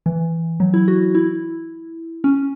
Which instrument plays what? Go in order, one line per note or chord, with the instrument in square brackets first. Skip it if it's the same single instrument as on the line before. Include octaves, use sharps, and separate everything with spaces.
[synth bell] E3
F#3
E4
F#4
E4
C#4